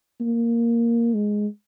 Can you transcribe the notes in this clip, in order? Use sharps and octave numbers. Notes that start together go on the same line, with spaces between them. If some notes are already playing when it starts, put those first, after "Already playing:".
A#3
G#3